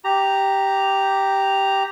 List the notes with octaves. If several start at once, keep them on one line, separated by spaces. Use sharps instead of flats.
G4 A#5